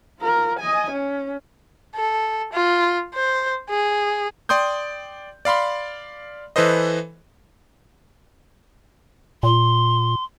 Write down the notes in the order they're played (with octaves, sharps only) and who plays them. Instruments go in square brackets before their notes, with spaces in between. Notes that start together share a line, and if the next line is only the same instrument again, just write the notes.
[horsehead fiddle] F4 A#4
D#5 G#5
C#4
[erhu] A4
F4
C5
G#4
[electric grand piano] D5 G5 C6 D#6 G6
D5 F5 B5 C6
E3 A4 B4 C5 D#5
[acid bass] A#2 [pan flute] C6